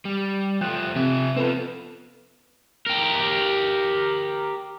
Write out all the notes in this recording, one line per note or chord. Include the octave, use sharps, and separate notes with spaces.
G3
F3 A3 G5 F#6
C3 F3 E5
B3 C4 F4 A4 B4
G4 A#4